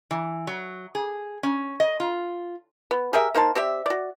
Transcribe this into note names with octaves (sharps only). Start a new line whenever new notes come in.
E3
F#3
G#4
C#4
D#5
F4
B3
G4 G#4 A#4 E5
A#3 D#4 C5 A5
C4 G4 D5 E5
F#4 D5